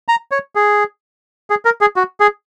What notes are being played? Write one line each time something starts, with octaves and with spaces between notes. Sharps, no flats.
A#5
C#5
G#4
G#4
A#4
G#4
F#4
G#4